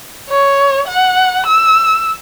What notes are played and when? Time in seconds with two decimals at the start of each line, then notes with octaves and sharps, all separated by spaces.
0.29 C#5
0.87 F#5
1.46 E6